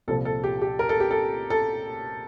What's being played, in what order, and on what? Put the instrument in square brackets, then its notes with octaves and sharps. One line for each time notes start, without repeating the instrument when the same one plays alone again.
[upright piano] C2 A#2 F3 A4
A4
G4
G4
A#4
A4
G4
A4
A4